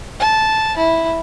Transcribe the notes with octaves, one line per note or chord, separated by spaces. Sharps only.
A5
E4